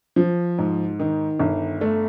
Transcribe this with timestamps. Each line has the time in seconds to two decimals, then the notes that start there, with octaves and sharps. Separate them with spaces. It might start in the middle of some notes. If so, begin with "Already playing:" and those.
0.16 F3
0.58 G#2
1.00 D#3
1.39 G1
1.81 A3